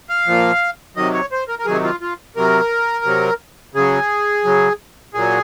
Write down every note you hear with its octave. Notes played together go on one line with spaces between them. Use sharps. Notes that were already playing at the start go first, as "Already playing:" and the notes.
F5
A#2 F3
C3 D#3 F#3 D#5
C#5
C5
A#4
A#4
C3 D#3 F#3 G#4
F4
F4
C3 F#3 A#4
C3 F#3
C#3 F#3 G#4
C#3 F#3
A#2 F#3 G#4